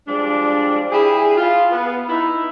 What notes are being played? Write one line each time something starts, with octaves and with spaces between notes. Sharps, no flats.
F3 G3 G#3 D4
E4 G4 G#4
F4
B3
D#4 E4